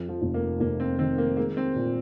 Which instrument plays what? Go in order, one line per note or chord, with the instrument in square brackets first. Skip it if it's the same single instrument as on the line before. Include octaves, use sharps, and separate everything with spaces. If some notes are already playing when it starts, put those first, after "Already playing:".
Already playing: [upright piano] F2
[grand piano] F3
[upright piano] F1
[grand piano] A#3
[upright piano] F1 [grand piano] A#3
[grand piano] C4
[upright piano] D#3 [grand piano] C4
[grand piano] A#3
[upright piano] G#3 [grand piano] A#3
[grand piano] C4
[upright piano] A#2